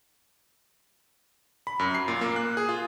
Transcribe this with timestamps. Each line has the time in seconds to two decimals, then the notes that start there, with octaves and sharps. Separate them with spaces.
1.67 B5
1.79 F#2
1.95 C7
2.08 A#2
2.21 A#3
2.36 F#6
2.57 G#4
2.69 F4